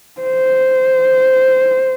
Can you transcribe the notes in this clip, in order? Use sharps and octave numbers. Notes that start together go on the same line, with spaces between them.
C5